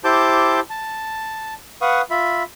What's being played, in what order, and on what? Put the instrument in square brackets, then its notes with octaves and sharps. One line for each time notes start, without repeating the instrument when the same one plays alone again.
[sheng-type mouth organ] E4 G4 C5 A5 D6 G6
A5
B4 F5 F#5 C#6 D#6
F4 E5 B5